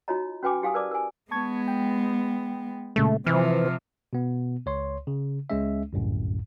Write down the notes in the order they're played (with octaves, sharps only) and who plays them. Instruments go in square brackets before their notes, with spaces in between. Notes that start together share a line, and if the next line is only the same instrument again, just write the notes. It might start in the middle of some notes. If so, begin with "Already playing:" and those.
[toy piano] D#4 F4 F#4 C#5 D#5 A#5
C#4 F#4 B4 G5 G#5 D6
E4 G4 F5 G#5 D#6
A#4 B4 D5 A5 D6
A#4 G#5
[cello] G#3 B3 [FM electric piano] A5 C#6 G#6
[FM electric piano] G5
[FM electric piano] A#2 C#3 G#3 [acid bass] A3
[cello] C3 F3 [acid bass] E3 [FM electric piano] F6
[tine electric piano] B2 B3
C#2 C#5 C6
C#3
C#2 G#3 C#4 E5
G1 C2 F#2 A2